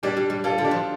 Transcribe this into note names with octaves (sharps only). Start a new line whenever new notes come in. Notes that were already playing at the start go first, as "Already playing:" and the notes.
G3 D4 G4
G3
G3
G3 F4 A4
D3
D4 G4
F3